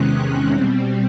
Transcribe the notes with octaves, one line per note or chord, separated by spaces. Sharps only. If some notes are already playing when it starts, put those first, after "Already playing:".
Already playing: E2 C3 D#3 G#3 C#4 F#6
B2 G3 C4